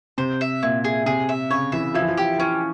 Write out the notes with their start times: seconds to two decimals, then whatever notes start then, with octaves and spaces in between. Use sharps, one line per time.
0.18 C3 C5
0.41 E5
0.63 A#2 E4
0.84 G#4
1.06 C3 G#4
1.29 E5
1.50 C#3 C#5
1.72 E3 E5
1.94 F3 E4
2.02 E3
2.08 F3
2.18 G4
2.39 E3 C#4